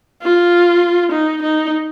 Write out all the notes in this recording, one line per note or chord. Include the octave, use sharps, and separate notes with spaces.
F4
D#4
D#4